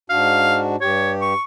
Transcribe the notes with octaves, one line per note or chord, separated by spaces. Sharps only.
G#2 D4 F#4 F5
G2 G4 C#5
C#6